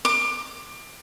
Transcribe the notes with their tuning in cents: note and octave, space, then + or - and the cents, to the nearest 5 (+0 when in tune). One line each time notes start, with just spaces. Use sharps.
D6 +25